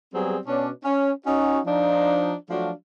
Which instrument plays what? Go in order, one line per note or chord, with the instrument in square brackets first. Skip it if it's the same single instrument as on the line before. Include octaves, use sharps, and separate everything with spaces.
[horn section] F#3 G3 B3 C4 G#4
B2 C#4 D4
C#4
C#4 D#4 F#4
F3 D4 D#4
F3 F#3 A3 D4 F#4 F5